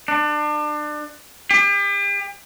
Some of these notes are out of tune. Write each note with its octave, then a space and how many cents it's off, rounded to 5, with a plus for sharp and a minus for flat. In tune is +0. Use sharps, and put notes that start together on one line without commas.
D4 +30
G4 +40